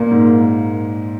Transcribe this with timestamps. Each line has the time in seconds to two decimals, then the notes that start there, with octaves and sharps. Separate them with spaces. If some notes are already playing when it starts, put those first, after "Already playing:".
Already playing: A#2 A#3
0.11 G#2